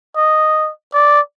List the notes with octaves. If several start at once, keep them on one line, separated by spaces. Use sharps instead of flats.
D#5
D5